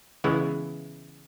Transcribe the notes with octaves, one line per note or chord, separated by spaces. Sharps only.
C#3 E3 G#3 B3 E4